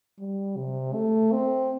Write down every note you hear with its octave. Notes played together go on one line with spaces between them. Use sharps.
G3
C3
A3
C4